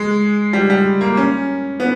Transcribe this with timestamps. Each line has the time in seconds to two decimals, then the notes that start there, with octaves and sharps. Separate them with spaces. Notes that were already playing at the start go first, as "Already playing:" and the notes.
Already playing: G#3
0.53 G3
0.70 G3
1.01 A#3
1.17 C#4
1.80 B3